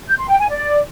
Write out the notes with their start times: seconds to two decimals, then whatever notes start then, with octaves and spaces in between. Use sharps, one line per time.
0.08 G6
0.18 C6
0.29 G5
0.39 G#5
0.49 D5